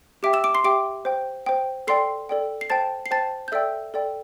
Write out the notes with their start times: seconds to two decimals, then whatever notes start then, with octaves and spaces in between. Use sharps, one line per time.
0.23 G4 E5 G5 D6 D7
0.33 E6 E7
0.44 D6 D7
0.54 C6 C7
0.64 G4 E5 G5 D6 D7
1.05 C5 G5
1.46 C5 G5
1.87 A4 D5 G5 C6 C7
2.29 A4 D5 G5
2.61 C7
2.70 C5 G5 A5 A6
3.06 C7
3.11 C5 G5 A5 A6
3.48 G6
3.52 A4 D5 E5 G5 E6
3.94 A4 D5 G5